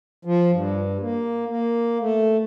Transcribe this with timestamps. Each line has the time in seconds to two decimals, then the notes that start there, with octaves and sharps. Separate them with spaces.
0.25 F3
0.51 G2
1.01 A#3
1.48 A#3
2.01 A3